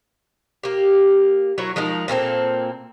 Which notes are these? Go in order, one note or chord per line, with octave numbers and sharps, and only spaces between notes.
A#3 G4
F#3 E4 A#4 C#5
F3 G#3 D#4 A#4
A#2 A#3 C4 A4